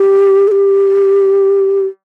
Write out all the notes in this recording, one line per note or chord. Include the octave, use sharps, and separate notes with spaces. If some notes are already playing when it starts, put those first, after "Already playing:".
Already playing: G4
A4
G4